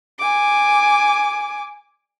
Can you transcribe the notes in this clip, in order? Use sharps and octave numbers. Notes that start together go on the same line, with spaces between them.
G#5 D6